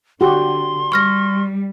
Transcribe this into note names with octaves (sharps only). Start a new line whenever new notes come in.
D3 F#4 G4 C6
G3 C#6 F6 A#6